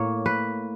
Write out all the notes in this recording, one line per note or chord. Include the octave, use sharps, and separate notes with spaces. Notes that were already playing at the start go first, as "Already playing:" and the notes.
Already playing: A2 A#3 C#5
B4